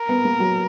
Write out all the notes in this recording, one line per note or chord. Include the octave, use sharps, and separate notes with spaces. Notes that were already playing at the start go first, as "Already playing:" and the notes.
Already playing: A#4
B3
A#3
F#3